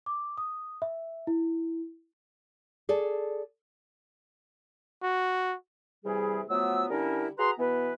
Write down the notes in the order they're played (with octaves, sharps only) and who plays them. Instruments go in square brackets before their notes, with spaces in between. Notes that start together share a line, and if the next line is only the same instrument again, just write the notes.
[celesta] D6
D#6
E5
E4
[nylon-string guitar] G#4 A4 D5
[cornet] F#4
[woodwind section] C3 E3 G3 G#4
F3 F#3 A3 B3 E6
D3 G3 C#4 D4 E4 A#4
F#4 G#4 B4 A#5 C6
B2 E3 B3 B4